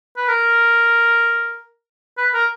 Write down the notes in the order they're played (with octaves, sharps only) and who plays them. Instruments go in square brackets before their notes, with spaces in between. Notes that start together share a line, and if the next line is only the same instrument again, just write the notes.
[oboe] B4
A#4
B4
A#4